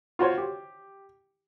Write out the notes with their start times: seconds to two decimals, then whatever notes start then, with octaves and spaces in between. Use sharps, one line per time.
0.19 F4 F#4 C5 C#5
0.38 G4